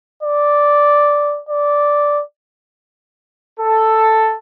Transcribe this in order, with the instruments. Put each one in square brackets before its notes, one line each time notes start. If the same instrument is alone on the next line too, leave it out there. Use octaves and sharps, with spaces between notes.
[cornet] D5
D5
[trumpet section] A4